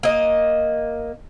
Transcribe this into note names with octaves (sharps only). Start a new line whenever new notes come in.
A#3 D#5